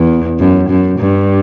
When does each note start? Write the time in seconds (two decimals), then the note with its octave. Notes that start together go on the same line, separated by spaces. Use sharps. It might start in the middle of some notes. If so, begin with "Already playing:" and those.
Already playing: E2
0.39 F#2
0.70 F#2
1.00 G2